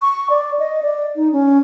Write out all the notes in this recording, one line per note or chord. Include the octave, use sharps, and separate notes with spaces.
C#6
D5
D#5
D5
D#4
C#4